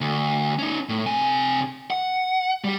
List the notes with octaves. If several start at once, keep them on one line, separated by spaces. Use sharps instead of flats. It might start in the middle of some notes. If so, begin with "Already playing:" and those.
D2
C#4 D#4
A2
C3 G#5
F#5
G3 G4